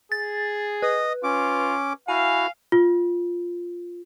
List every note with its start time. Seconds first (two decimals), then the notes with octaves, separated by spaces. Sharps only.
0.12 G#4 A6
0.82 B4 D#5
1.24 C#4 F4 D6
2.08 E4 F#4 F5 G#5
2.72 F4